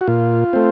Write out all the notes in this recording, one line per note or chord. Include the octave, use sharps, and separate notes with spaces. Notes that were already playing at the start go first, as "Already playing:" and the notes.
F#4
A#2 F4
A3 C4